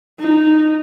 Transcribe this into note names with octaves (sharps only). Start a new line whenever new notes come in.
D#4